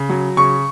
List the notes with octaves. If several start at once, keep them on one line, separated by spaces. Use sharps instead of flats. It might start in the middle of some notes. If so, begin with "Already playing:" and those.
Already playing: C#3
F#3
C#3 C#6